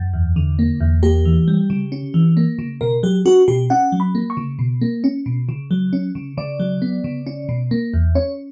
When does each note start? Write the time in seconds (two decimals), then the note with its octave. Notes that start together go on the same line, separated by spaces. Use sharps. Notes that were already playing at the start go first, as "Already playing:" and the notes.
Already playing: F#2
0.14 E2
0.36 D3
0.59 A#3
0.81 E2
1.03 A#3 G4
1.25 E3
1.48 G3
1.70 C#3
1.92 C#4
2.14 E3
2.37 A#3
2.59 C#3
2.81 B2 A#4
3.03 F#3 G4
3.25 C#4 F#4
3.48 B2 G4
3.70 C#4 F#5
3.92 F#3
4.00 B5
4.15 A#3
4.30 C#6
4.37 C#3
4.59 B2
4.82 A#3
5.04 C#4
5.26 B2
5.49 C#3
5.71 F#3
5.93 C#4
6.15 C#3
6.37 C#3 D5
6.60 F#3
6.82 B3
7.04 C#3
7.27 C#4
7.49 B2
7.71 A#3
7.94 E2
8.15 C#4 C#5